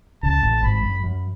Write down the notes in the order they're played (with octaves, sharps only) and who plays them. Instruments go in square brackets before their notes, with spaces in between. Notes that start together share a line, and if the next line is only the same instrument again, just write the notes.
[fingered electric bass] C#2 C#3 [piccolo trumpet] A5
[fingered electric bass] A1 A2
[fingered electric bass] G#1 G#2 [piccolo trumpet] B5
[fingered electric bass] F#2
F#2